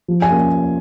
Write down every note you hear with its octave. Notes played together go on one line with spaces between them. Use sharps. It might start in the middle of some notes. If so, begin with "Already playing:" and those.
F3
G#5
A#3 C#4